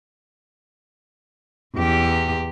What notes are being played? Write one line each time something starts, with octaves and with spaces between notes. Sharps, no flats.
E2 G4